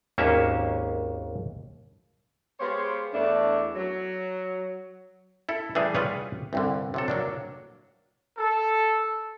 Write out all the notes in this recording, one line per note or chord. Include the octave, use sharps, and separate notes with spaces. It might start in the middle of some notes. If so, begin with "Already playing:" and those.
G#1 D#2 A#3 C#4 E5
G#3 B3 G4 C5 C#5 F5
E2 A3 D4
F#3
E4 A4
E3 G3 A3 D4 G4 G#4
G3 F4 G#4 B4 C#5
C2 G2 D3
C3 F#3 A4
F#3 A#3 D4
A4